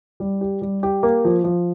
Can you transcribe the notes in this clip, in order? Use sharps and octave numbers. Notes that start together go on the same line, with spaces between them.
G3
G4
G3
G4
A#3
F3
F3